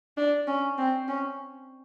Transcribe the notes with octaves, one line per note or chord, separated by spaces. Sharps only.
D4
C#4
C4
C#4